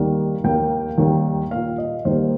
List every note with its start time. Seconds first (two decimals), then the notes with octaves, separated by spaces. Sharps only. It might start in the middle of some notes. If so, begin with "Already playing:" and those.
Already playing: D#2 D#3 G3 A#3
0.44 D#2 D#3 A#3 G5
0.98 D#2 D#3 G3 A#3
1.51 A#2 A#3 F5
1.78 D#5
2.05 D#2 D#3 G3 A#3 C5